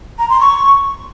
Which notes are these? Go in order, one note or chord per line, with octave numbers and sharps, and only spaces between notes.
A#5
C6
C#6